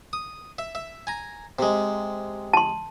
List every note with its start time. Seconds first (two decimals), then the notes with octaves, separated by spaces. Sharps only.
0.13 D#6
0.58 E5
0.75 E5
1.07 G#5 A#5
1.59 C3 G#3
2.53 A5 C6